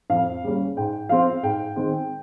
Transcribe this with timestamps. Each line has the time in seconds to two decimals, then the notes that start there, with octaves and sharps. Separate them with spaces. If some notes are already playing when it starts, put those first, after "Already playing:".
0.10 F2 F5
0.43 C#3 G3 A#3 C#4
0.77 G#2 G5
1.09 F3 C4 F5
1.43 G#2 G5
1.76 D#3 G#3 C4